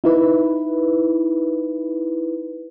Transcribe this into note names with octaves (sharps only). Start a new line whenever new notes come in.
D#4 E4 B4